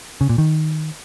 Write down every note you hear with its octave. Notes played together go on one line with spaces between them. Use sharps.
C#3
A#2
D#3